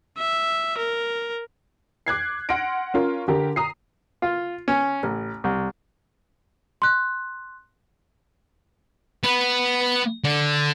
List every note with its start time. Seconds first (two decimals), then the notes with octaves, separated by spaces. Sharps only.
0.18 E5
0.78 A#4
2.07 D6 F#6 G#6 C7
2.49 F#5 C6 F6 A#6 D7
2.94 C#4 F4 A#4
3.28 D3 G4 A#4
3.56 A#5 D#6 C7
4.22 F4
4.68 C#4
5.03 A1
5.44 C2
6.82 C6 F#6
9.24 B3 B4
10.24 D3